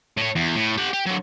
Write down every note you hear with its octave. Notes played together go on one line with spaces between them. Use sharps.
A2 C#5
E2
A2
G4 F#5
G4
D3 F#3